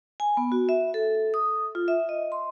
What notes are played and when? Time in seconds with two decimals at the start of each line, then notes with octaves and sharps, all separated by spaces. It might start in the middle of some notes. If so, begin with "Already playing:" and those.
0.20 G#5
0.37 B3
0.52 F#4
0.69 E5
0.94 A4
1.34 D#6
1.75 F4
1.88 E5
2.09 D#5
2.32 C6